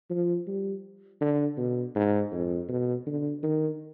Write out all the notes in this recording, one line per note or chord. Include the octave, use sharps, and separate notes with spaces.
F3
G3
D3
B2
G#2
F2
B2
D3
D#3